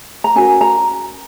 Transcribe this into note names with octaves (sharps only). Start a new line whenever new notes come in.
A#5
C#4 F#4 A#4 G#5
A#5